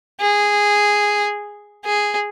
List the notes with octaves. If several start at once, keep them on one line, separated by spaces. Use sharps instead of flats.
G#4
G#4